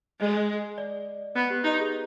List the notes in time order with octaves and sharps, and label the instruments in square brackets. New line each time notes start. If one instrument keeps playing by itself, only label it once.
[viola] G#3 [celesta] D#5
[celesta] D5
[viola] B3 [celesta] B4
[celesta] G4
[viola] D#4 [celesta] G4
[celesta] G#4